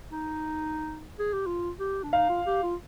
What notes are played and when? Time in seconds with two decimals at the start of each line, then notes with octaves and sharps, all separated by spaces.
0.11 D#4
1.19 G#4
1.33 G4
1.46 F4
1.80 G4
2.03 D4
2.13 D#4 F5
2.29 F4
2.46 G4
2.63 F4